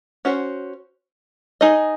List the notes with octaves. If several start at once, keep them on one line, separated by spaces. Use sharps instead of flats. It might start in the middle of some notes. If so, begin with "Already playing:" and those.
C#4 F#4 C5
D#4 G#4 D#5